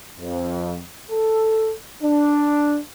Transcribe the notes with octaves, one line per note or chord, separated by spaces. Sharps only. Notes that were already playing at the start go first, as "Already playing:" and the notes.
F2
A4
D4